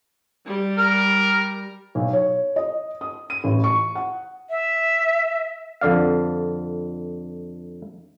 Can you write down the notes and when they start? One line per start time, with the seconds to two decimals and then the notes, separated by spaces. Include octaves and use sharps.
0.46 G3
0.77 A#4
1.95 B1
2.13 C#5
2.56 D#5
3.01 D#6
3.30 D#7
3.44 A1
3.64 C#6
3.95 F#5
4.50 E5
5.81 F2 D3 D5 F5